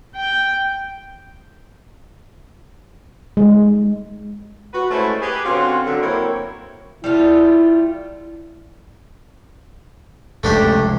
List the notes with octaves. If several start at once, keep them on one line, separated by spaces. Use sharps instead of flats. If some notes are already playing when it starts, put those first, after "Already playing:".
G5
G#3
F#4 B4
G#3 A3 C#4 E4 F#4 C5
G4 G#4 B4
D3 C4 C#4 F4 F#4
D3 F#3
F#3 A#3 C4 E4 A#4 C#5
G3 A3 E4 F4
F1 C#2 F#2 A3 D4 G4